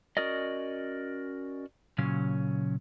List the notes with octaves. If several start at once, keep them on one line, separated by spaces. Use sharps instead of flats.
C#4 F#4 A#4 D5 D#5
A#2 C#3 F#3 C#4